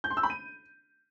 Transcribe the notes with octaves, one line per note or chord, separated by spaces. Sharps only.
G6
C6
E6
B5
D#7